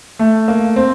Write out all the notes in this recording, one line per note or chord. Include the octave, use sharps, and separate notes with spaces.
A3
A#3
C4